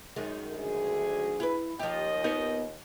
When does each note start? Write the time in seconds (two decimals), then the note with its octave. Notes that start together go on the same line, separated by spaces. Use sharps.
0.16 F#2 D#3 G#3
0.54 D2 G#4
1.40 E4 B4
1.79 D#2 F3 G4 D#5
2.24 B3 D#4 A#4